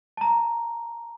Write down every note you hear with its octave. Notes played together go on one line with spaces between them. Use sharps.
A5 A#5